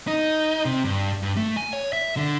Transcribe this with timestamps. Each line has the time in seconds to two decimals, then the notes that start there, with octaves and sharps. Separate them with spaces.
0.07 D#4
0.65 C3
0.85 G2
1.23 G2
1.37 A3
1.57 G#5
1.73 C#5
1.93 E5
2.17 D3